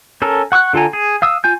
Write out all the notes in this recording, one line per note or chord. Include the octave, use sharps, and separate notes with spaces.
C#4 A4 A#4
F#5 C#6 E6 F#6
D3 F4 A4 G#5 A#5
G#4
F5 D#6 E6
F4 G#5 G6